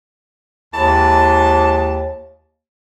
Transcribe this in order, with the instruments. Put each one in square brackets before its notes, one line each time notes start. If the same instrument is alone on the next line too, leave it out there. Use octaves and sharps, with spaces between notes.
[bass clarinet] D#2 [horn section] E3 G#3 A5